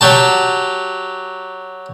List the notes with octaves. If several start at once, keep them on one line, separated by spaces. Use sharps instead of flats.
F#3 G4 A5